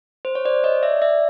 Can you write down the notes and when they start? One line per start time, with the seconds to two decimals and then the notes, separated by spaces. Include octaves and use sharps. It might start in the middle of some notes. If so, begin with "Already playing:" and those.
0.25 C5
0.35 C#5
0.45 C5 D5
0.64 C#5 D#5
0.83 D5 E5
1.02 D5 E5